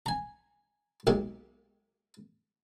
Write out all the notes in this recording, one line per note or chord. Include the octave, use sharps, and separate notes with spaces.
G#5 A#5
B1 G#3 A#3 G4